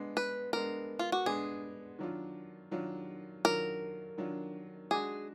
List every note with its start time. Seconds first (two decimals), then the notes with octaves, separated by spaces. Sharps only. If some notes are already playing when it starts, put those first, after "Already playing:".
Already playing: G#3 B3 D4
0.17 B4
0.53 G#3 B3 D4 A#4
0.99 F4
1.12 F#4
1.26 G#3 B3 D4 G#4
1.99 D#3 F#3 D4 F4
2.71 D#3 F#3 D4 F4
3.45 D#3 F#3 D4 F4 A#4
4.18 D#3 F#3 D4 F4
4.91 G#3 D4 F#4 G#4